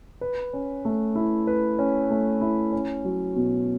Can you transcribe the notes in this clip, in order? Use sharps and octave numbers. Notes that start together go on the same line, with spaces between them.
B4
C#4
A3
E4
B4
C#4
A3
E4
C#4
F#3
B2